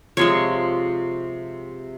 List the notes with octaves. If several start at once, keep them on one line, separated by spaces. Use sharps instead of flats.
C3 F3 G#3 C#5